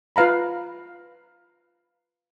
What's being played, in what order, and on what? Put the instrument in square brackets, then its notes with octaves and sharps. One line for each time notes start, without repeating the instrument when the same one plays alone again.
[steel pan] F4 B4 F5 A#5 B5